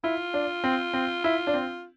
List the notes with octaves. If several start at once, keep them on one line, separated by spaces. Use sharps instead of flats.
E4 F4
D4
C4
C4
E4
D4
C4